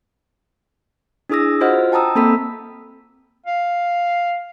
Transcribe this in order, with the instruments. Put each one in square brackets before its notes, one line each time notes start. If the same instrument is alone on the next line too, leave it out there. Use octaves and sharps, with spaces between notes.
[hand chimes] D4 E4 G#4 D#6 E6 A#6
F4 F#4 C5 D#5 F#5 F6
G5 A5 A#5 D#6 E6
A#3 C4 A4 B5 E6 B6
[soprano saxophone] F5